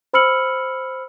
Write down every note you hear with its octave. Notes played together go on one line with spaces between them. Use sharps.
C5 B5 E6 F6 C#7 F#7